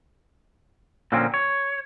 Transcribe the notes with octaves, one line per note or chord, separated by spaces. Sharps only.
A#2 D3 F3 A#3 C4 C#4
C#5